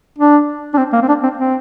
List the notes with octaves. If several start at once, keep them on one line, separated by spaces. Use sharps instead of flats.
D4
D4
C4
A#3
C4
D4
C4
C4